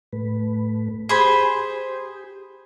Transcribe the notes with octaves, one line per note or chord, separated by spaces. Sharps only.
A2 A3 B4
G4 G#4 C5 B5